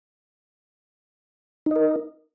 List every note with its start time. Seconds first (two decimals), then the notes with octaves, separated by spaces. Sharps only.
1.66 D#4
1.71 D#5
1.76 A#4